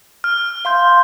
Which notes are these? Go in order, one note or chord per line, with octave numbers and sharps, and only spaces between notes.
F6
F5 C6 G6